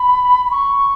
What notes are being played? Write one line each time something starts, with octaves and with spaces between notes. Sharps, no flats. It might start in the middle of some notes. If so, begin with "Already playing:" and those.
Already playing: B5
B5
C#6